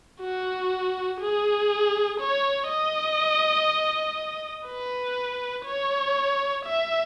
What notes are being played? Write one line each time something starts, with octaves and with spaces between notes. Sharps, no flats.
F#4
G#4
C#5
D#5
B4
C#5
E5